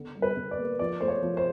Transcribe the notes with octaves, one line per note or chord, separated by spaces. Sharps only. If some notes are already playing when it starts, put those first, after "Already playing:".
Already playing: D3 B3
G3
B4
D3
D5
A#3
F3 D5
A3 C5
C#5
F3
C5